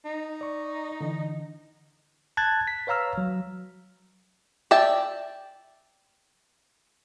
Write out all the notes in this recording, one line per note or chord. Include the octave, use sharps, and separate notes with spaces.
D#4
D5 C#6
D3 E3
A5 F#6 G#6 A6
B6
B4 C#5 F5 A#5 E6 F6
F#3
D5 E5 G5 A5